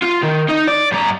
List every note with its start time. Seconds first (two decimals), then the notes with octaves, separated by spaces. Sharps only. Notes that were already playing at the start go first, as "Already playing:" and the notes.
0.03 F4
0.23 D#3
0.49 D#4
0.68 D5
0.92 G2 A#5